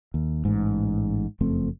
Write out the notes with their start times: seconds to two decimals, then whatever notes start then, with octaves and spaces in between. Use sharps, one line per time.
0.14 D#2
0.45 A1 G#2
1.41 F#1 F2 A3 C4